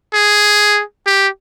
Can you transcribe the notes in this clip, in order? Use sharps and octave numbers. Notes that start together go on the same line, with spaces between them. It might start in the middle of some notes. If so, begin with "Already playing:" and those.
G#4
G4